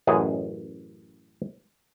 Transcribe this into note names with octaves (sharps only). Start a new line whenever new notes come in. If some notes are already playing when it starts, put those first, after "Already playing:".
A1 F#2 G#4